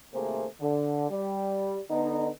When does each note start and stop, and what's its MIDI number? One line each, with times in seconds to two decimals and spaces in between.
0.14 0.45 32
0.14 0.45 48
0.14 0.45 57
0.14 0.45 58
0.14 0.45 68
0.14 0.45 72
0.60 1.08 50
1.10 1.80 55
1.90 2.28 50
1.90 2.28 59
1.90 2.28 63